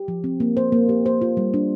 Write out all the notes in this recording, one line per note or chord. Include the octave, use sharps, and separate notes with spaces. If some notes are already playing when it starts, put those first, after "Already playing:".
Already playing: G4
F3
C4
A#3
C5
A#3
G4
C5
F4
G3
D4